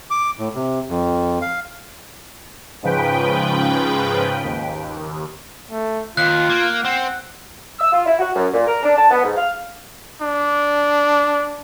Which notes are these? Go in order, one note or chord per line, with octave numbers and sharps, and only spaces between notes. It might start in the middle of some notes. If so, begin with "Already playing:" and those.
D6
A2
C3
F2
F5
G#2 C#3 F3 B4 G5
D#2
A3
D#2 F4 F#6
A#3
C4 F#5
E6
F4
E4
F#4
F#2
A#2
A#4
D4
A5
B3
G#2
F5
D4